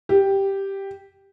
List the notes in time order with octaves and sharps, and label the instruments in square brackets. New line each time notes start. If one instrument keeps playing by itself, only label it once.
[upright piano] G4